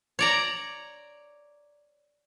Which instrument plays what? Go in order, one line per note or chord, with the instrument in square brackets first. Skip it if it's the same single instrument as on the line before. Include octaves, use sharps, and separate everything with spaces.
[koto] C#5 D5 A#5